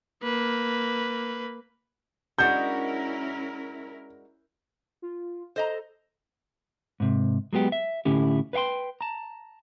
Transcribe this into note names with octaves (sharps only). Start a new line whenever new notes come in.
A#3 B4
G#3 C#4 D4 E4 F#4 A#4 G6
F4
A4 C5 D#5 A#5
G#2 C3
F#3 G#3 B3 G4
E5
A2 D3 C#4 E4 G4
B4 C#5 F5 G5 C6
A5 A#5